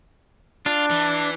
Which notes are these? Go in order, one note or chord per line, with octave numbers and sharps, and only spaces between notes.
D4 F4
E3